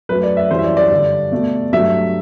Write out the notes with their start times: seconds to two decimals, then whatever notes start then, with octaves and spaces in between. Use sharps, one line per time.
0.09 F#2 F#3 A3 B4
0.23 D5
0.37 E5
0.50 F#2 E3 G3 C5
0.58 E5
0.64 D5
0.77 D5
0.90 G2 D3 G3
1.32 B2 A3
1.72 G2 F#3 A3 E5